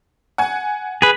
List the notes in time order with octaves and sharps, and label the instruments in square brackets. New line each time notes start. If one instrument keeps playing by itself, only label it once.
[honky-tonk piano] F#5 G#5
[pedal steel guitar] G#4 B4